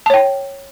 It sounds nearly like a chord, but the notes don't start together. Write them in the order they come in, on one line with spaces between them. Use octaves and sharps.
A5 C#5 G5